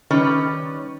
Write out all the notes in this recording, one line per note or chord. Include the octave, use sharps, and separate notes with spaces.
D#3 G3 C#4 B4 C#5